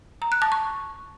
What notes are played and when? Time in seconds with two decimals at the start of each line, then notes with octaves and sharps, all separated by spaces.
0.22 A#5
0.32 F#6
0.42 A5
0.52 C#6